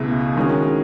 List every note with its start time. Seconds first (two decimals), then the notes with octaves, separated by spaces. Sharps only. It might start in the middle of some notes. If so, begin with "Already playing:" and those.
Already playing: C#2 B2 A3 E4 G#4
0.36 D#3 G#3 C#4 F#4